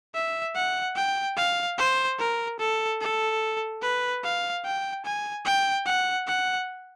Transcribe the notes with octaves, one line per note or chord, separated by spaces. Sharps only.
E5
F#5
G5
F5
C5
A#4
A4
A4
B4
F5
G5
G#5
G5
F#5
F#5